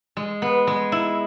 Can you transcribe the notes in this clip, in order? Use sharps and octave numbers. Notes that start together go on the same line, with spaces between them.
G#3
B3
G#3
E4